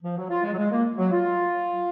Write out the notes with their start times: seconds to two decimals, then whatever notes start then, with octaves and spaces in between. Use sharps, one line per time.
0.03 F3
0.17 F#3
0.30 F4
0.43 G#3
0.53 F#3
0.57 G#3
0.71 A#3
0.98 F#3
1.11 F4